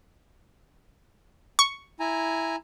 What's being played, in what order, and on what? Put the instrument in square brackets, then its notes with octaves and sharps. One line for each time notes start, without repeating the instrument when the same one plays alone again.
[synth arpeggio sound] C#6
[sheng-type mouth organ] E4 G#5 A#5